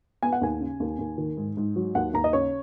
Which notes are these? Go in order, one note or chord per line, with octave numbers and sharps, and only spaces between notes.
B3 G#5
F#5
D#2 G#5
C#3
D#2
D#2
D#3
G#2
G#2
F#3
D#2 F#5
D#2 A#5
D#5
C#3 C#5